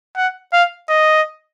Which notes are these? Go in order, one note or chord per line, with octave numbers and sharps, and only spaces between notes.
F#5
F5
D#5